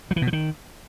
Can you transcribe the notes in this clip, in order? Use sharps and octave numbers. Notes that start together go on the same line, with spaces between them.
F#3
E3
B2
F3
D#3